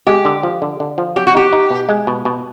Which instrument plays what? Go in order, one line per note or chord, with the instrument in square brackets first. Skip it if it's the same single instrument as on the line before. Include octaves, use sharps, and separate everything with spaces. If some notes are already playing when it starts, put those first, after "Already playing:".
[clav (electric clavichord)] G#3 [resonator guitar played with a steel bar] G4
[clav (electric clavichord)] D3
F3
D3
D3
F3
[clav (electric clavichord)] F#3 [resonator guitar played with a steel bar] G4
[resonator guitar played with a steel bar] F#4
[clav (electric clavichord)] D#4 [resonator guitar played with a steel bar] G4
[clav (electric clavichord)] D#4
B2
G#3
B2
B2